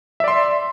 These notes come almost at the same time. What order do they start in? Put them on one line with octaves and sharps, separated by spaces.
E5 D5 C6